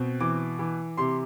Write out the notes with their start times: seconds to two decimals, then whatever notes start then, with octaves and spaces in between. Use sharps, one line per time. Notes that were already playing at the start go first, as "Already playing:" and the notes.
Already playing: B2 C4
0.20 E3 D6
0.59 E3
0.97 C3 C6